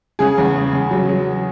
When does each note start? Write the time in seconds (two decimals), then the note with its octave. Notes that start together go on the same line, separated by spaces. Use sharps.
0.19 C#3 G#4
0.38 E2
0.56 C#3
0.73 C#3
0.91 F#3
1.09 F#3